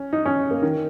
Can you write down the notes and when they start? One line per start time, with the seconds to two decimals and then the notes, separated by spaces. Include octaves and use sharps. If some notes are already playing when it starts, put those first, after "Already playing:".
Already playing: C#4
0.13 D#4
0.26 C#4
0.51 A#3
0.62 D#3